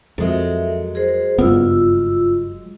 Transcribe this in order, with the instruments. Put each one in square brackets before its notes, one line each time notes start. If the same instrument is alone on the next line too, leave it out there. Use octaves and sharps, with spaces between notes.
[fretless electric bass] F2 [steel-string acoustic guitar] F#3 G#3 [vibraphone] A4 A#4 E5
[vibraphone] G#4 A#4 C5
[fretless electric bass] F#1 G2 [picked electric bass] B3 [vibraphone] F4 E6